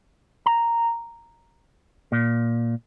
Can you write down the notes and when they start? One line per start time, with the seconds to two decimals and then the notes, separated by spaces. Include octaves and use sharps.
0.46 A#5
2.12 A#2